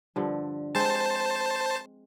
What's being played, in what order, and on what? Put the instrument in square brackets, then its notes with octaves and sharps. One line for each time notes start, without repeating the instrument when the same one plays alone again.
[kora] G2 D3 F3
[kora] G#3 C4 [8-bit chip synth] C5 A5